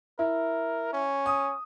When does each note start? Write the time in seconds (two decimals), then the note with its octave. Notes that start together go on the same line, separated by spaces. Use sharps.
0.19 E4 A#4
0.93 C#4
1.26 D#6